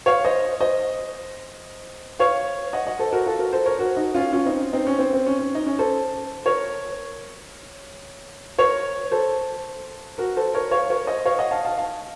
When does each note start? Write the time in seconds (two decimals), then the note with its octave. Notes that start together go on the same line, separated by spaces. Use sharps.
0.06 C#5 F5
0.25 C5 D#5
0.61 C5 D#5
2.19 C#5 F5
2.73 D#5 F#5
2.86 D#5 F#5
2.99 A4 C5
3.12 F#4 A#4
3.26 F4 A4
3.39 F#4 A#4
3.53 A4 C5
3.66 A#4 C#5
3.76 C5
3.79 F#4 A#4
3.97 D#4 F#4
4.14 C#4 F4
4.33 C#4 F4
4.45 C4 D#4
4.73 C4 D#4
4.87 C#4
4.99 C4
5.13 C4
5.26 C#4
5.39 C#4
5.55 D#4
5.66 C#4
5.79 A4 C5
6.46 A#4 C#5
8.58 A#4 C#5
9.11 A4 C5
10.18 F#4 A#4
10.37 A4 C5
10.54 A#4 C#5
10.71 C#5 F5
10.90 A#4 C#5
11.07 C5 D#5
11.25 C#5 F5
11.38 D#5 F#5
11.51 F5 A5
11.65 F5 A5
11.78 F5 A5